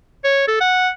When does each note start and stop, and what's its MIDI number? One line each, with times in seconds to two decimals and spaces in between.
0.25 0.47 73
0.48 0.56 69
0.61 0.90 78